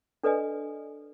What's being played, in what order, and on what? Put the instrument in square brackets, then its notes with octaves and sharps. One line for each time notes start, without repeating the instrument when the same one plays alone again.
[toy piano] D4 A4 B4 D5 D#5 G#5